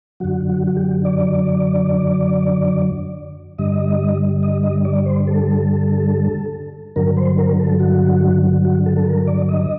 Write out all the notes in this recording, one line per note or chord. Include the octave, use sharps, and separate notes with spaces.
F#2 D3 F#3 F#4
F#4
F#4
G4
D5
G2 D3 G3 D#5
D#5
D#5
D5
C5
A4
G2 D3 F#3 A#4
C5
A#4
A4
F#4
F#4
A4
A4
A#4
D5
D#5